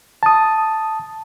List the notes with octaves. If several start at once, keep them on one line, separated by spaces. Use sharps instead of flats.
A5 D#6